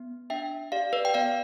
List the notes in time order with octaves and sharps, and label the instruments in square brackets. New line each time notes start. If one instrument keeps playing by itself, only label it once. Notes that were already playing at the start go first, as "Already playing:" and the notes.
Already playing: [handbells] B3
D4 E5 G5
G4 D5 F5
B4 D5
G5
B3 D5 F5